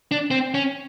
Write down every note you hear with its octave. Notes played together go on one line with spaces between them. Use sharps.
D4
C4
C#4